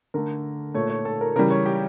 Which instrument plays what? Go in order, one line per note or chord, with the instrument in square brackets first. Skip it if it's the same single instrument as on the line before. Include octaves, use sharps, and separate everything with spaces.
[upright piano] D3 A3 A#4
A#2 A3 C#5
C#5
A4
A#4
C#3 E3 G3 A#4
C#5
G4